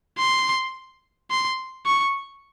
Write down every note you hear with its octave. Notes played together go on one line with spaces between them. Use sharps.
C6
C6
C#6